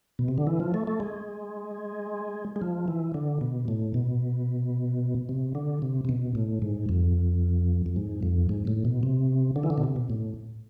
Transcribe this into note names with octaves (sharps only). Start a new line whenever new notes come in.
B2
C3
D3
E3
F3
A3
A3
G#3
G#3
F3
E3
D3
B2
A2
B2
C3
D3
C3
C3
B2
A2
G#2
F2
F2
G#2
F2
G#2
A2
B2
C3
D3
E3
D3
B2
C3
B2
A2